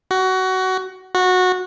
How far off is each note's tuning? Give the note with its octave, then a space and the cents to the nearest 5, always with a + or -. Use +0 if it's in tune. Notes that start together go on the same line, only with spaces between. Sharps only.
F#4 +20
F#4 -15